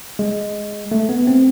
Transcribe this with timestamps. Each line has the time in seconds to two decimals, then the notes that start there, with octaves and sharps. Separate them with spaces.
0.19 G#3
0.92 A3
1.09 B3
1.27 C4